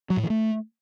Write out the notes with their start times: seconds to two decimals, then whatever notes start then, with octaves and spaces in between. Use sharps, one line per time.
0.10 F#3
0.17 A2
0.23 E3
0.30 A3